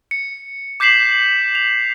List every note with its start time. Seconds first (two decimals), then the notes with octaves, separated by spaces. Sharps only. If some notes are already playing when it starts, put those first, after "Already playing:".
0.11 C#7
0.80 D6 G6 B6 C7 E7 F#7
1.55 F7